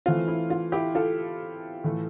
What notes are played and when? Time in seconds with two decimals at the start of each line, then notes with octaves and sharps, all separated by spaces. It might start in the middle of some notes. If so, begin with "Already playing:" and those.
0.06 E3 A3 C4 F4
0.28 E4
0.50 F4
0.72 E4 G4
0.95 F4 A4
1.84 A2 E3 A3